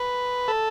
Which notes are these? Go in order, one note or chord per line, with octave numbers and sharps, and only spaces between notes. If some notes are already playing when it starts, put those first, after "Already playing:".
Already playing: B4
A4